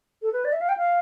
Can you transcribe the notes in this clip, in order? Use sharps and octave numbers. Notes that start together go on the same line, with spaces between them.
A4
B4
D5
E5
F5
G5
F5